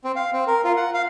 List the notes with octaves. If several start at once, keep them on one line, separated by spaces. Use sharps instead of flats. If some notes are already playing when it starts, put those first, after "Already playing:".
C4
F5
C4
A#4
F4
F#5
F5